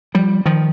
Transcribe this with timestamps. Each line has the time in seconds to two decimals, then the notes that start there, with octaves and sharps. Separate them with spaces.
0.15 F3 G3
0.46 D#3 F3